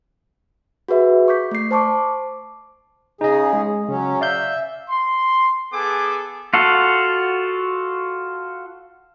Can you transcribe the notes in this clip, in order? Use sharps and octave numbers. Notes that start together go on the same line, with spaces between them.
F#4 G#4 B4 E5
C#6 D6 G6 B6
A3 C7
C5 A5 C#6 D6
C#3 D#4 G#4 D#5
G#3
C#3 F#3 C#4
D5 E5 F5 G6
C6
B3 G#4 A4 G#5 D6
F4 F#4 A4